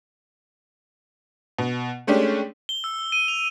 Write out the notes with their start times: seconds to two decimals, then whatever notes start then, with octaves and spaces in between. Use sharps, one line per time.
1.58 B2
2.07 G#3 A3 C#4 D4 G4
2.69 G7
2.84 E6
3.12 D#7
3.28 F7